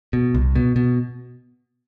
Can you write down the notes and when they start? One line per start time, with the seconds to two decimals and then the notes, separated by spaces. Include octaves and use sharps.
0.13 B2
0.35 C2
0.55 B2
0.76 B2